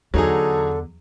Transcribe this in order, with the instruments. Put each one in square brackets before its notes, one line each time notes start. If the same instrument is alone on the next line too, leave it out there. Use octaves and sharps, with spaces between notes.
[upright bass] E2 [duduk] D3 [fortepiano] F#3 D#4 G#4 [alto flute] A4